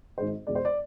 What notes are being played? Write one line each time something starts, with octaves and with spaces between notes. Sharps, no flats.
G#1 G#2 G#3 C5
E1 E2 B2 G#3 D5
C5
D5